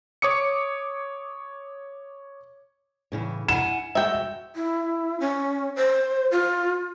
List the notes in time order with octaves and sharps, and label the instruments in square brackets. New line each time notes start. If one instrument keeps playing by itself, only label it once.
[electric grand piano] C#5 D6 D#6 C#7
[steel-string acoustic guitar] A2 C#3 E3
[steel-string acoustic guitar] E4 F#5 G#5 [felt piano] E7
[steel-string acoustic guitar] G#3 F#4 [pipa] E5 G5
[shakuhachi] E4
C#4
C5
F4